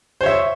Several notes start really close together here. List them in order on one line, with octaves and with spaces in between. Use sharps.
C5 C#5 E5